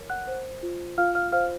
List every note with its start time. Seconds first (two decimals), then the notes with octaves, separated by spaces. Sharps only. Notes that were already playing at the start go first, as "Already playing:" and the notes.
Already playing: A#4 C#5
0.10 F#5 F#6
0.27 C5
0.63 F4
0.98 F4 F5 F6
1.15 F5 F6
1.32 C5 F5 F6